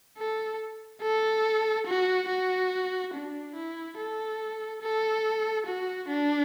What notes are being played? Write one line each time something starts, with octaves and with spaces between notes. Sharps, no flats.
A4
A4
F#4
F#4
D4
E4
A4
A4
F#4
D4